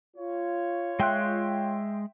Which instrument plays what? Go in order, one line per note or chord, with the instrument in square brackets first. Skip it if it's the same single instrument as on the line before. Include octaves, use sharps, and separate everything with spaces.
[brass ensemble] F4 C#5
[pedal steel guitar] G#3 F#6 [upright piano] E5 G5 C6